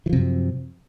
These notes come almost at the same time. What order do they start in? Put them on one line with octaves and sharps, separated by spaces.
E3 F3 C3 F#2